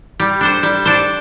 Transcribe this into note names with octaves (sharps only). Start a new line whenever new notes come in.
G3
D4 A4 C5
G3
D4 A4 C5